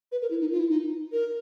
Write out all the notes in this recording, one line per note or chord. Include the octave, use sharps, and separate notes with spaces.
B4
A#4
E4
D#4
F4
E4
D#4
A#4